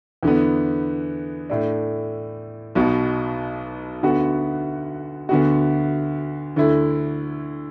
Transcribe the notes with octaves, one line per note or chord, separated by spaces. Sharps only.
E2 D3 B3
A2 A3 D4
B1 B2 B3
D2 D3 B3 F#4
D2 D3 B3 F#4
D2 D3 A3 E4